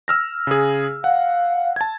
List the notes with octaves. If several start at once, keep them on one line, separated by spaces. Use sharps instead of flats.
E6 F6 A#6
C#3 G#4
F5 F#5
A5 G#6